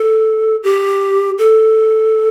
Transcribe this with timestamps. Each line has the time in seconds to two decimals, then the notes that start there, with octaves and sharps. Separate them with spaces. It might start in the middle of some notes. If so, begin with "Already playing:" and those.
Already playing: A4
0.63 G4
1.38 A4